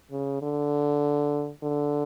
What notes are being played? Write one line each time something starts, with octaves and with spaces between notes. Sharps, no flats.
C#3
D3
D3